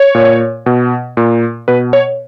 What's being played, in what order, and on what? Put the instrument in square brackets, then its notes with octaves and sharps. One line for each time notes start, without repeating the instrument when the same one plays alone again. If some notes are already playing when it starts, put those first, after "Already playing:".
Already playing: [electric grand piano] C#5
A#2
B2
A#2
B2 B4
C#5